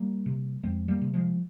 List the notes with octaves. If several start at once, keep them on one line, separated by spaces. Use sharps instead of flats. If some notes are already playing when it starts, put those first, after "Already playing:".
Already playing: G3 A#3
C3
F2 G#3 C4
G3 A#3
C3
F3 G#3